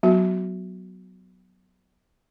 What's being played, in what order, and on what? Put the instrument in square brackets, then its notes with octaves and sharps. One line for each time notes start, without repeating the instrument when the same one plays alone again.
[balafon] F#3 B3 F#4